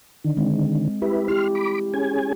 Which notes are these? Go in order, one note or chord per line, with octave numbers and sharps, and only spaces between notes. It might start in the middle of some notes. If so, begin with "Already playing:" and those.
D3 D#3
G#3 C4
E4 G4 B4
E4 G4 C6 F6
B5 D6
C#4 G#4 G#5